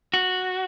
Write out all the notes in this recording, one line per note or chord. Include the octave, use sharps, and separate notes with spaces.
F#4